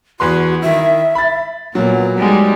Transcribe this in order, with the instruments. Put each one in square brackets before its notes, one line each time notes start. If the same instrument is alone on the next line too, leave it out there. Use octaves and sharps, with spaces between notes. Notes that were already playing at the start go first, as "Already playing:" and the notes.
[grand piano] E2 B4 C6 [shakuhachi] F#4
[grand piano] D#3 E4 [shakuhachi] E5
[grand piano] B5 A6
[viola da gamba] A#2 [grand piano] F#3 A#3 [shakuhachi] B3
[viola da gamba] G3 G#3 D#4